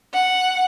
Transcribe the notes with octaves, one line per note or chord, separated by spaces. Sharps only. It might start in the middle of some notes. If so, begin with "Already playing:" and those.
F#5